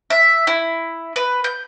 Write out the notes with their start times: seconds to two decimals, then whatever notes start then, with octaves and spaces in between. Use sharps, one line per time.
0.10 E5
0.47 E4
1.16 B4
1.44 G6